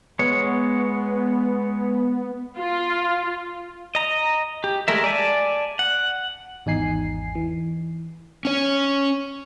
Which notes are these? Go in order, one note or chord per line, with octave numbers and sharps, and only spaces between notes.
G#3 B3 C#5
F4
D#5 A#5
G4
G#3 A3 A#4 E5
D5 G#5 A5
F#5
G#1 E2 D#4 G#5 C7
E3
C#4 C#5